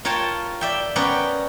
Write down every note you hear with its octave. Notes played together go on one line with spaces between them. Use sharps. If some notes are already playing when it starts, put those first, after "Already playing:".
F4 A#4 C#5 G5 A5
D5 E5 G5
B3 C#4 A#4 B4 D5 G5